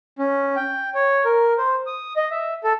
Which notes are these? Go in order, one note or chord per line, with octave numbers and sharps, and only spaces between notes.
C#4
G5
C#5
A#4
C5
D#6
D#5
E5
A4